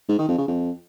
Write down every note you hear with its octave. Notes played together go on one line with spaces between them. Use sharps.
G#2
D#3
F2
C#3
F2